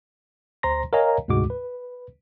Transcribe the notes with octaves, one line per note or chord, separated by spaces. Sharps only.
D2 C5 A#5 C6 A#6
A#4 C#5 D#5 F5 G#5 A#5
D2 G#2 C3 G#3 F#4 D6
B4